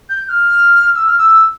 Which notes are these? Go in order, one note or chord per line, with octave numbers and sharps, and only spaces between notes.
G6
G6
F6
E6
F6
E6